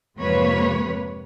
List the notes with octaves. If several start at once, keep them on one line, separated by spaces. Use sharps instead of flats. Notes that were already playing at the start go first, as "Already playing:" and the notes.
F2 G#2 C3 A#3 B4 C#5